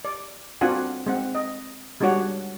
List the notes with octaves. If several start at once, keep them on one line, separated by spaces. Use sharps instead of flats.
D5
C4 D4 F4 F#4 F#5 G#5
G#3 C4 F#5
D#5
G3 G#3 D4 F#4 C#5 F#5